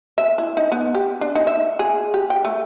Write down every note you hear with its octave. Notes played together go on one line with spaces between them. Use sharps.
E5
E4
D#4
B3
G4
D4
D#4
E5
G#4
G4
G5
A3